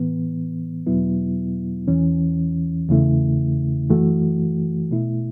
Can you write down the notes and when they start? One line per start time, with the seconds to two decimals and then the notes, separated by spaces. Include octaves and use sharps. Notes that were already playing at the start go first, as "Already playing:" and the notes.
Already playing: A2 E3 B3
0.87 E2 B2 F#3 B3 E4
1.88 E2 E3 C#4
2.88 E2 C#3 A3 E4
3.90 F#2 E3 A3 F#4
4.91 B2 A3 E4